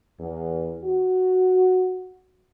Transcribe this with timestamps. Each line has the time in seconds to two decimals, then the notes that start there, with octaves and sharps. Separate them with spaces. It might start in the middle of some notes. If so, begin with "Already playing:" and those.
0.20 E2
0.84 F#4